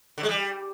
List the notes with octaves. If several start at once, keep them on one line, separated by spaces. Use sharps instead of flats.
D3
G#3
G3